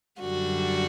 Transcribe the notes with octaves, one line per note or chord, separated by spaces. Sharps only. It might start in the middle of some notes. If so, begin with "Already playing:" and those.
F#2 D3 G3 F#4